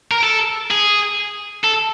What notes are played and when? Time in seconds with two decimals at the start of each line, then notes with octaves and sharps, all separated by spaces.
0.11 A#4
0.24 A4
0.71 G#4
1.64 A4